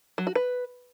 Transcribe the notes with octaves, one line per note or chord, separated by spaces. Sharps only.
F#3
F#4
B4